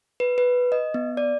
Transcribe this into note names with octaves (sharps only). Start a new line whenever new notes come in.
B4
B4
D#5
B3
D5